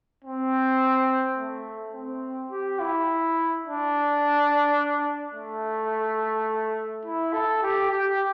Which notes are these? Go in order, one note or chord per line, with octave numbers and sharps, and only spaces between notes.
C4
A3
C4
G4
E4
D4
A3
E4
A4
G4
G4